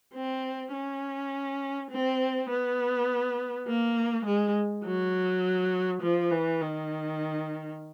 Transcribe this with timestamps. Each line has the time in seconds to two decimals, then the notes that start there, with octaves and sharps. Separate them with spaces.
0.14 C4
0.73 C#4
1.91 C4
2.49 B3
3.67 A#3
4.26 G#3
4.84 F#3
6.02 F3
6.31 E3
6.61 D#3